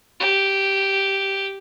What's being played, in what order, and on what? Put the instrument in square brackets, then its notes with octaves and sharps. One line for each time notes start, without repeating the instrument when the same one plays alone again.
[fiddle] G4